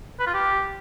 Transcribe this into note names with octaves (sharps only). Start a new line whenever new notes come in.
B4
F4
G4